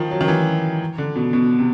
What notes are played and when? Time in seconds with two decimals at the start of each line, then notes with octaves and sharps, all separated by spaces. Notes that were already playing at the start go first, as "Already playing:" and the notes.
Already playing: D#3 F3
0.11 F#3
0.21 D#3
0.28 E3
0.98 D3
1.16 B2
1.33 B2
1.59 C3